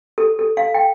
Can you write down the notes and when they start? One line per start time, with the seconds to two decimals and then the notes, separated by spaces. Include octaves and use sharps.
0.18 A4
0.39 A4
0.57 F5
0.74 G5